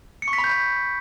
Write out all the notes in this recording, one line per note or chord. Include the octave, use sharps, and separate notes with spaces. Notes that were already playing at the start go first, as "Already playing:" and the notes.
C#7
C#6
B6
B5
G6